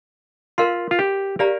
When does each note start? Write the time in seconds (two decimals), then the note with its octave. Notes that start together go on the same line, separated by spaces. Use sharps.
0.58 F4 A#4 F5 C6
0.91 F4
0.99 G4
1.39 G4 A#4 D5 F5 A#5